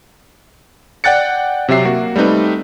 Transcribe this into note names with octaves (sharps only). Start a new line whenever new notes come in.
D5 F#5 G5 F#6 A6 C#7
C3 F#3 G4 E5 C7
A#3 F#4
G3 A3 C4 D#4 B4